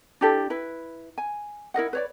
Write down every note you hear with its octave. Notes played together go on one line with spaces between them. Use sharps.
D4 E4 G4 A4
E4 B4
G#5
E4 A#4 D#5 F#5
B4 C#5 D5